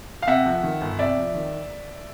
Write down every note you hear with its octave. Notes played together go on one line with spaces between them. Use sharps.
F5
C3 E5 F#5
F2
D#3
G1
C3 D5 E5
F2
D#3